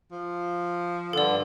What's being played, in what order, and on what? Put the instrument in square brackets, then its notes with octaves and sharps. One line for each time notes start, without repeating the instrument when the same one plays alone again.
[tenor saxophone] F3
[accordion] G2 D3 [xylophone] A4 D5